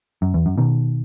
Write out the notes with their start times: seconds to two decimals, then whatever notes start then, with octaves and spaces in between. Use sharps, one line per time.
0.22 F#2
0.34 E2
0.46 F#2
0.58 B2 D#3